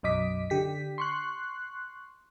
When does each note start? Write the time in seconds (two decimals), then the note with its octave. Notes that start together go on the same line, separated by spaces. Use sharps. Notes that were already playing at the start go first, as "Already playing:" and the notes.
0.03 B1 F#2 D#5 D6 B6
0.50 D3 G4 B6
0.98 C6 C#6 F#6